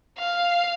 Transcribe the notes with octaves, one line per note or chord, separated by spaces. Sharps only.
F5